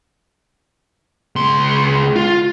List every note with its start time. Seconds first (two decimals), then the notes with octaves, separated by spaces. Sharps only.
1.36 C#2 C6
2.16 F4